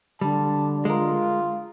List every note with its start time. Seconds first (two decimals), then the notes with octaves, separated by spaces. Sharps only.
0.21 D3 G3 A5
0.85 G#3 F4 A#4